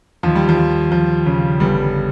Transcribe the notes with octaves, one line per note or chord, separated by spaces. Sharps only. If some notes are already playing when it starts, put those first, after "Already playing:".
D#2 F3
G3
F3
D#2
F3
C#3
G1 G3